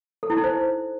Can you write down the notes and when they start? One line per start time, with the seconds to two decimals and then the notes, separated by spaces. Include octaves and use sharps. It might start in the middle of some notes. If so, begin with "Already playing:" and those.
0.23 A4
0.30 E4
0.37 D#4
0.44 C5